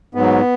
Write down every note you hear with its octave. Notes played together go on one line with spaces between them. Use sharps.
G#2 F#3 B3